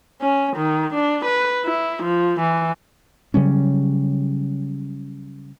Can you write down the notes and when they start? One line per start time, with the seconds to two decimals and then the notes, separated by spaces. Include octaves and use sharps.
0.21 C#4
0.57 D#3
0.94 D4
1.25 B4
1.65 E4
2.03 F3
2.40 E3
3.34 C#3 F#3 G3 C#4